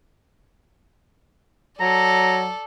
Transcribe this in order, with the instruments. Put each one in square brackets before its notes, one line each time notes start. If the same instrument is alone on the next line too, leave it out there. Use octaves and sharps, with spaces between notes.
[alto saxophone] F#3 [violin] A4 D5 [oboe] A#5